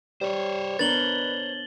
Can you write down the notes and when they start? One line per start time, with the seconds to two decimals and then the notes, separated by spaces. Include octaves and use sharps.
0.21 G3 C5 C#5
0.79 B3 D4 A#4 B4 A6 F#7 G7